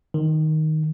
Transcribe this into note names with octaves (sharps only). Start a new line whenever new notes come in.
D#3